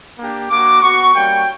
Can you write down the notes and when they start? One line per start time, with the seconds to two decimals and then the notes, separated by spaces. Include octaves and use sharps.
0.16 A#3 D4 G4
0.49 A#3 D4 F#4 D6
0.81 B3 F#4 C#6
1.14 G3 A#3 C#4 F#4 G5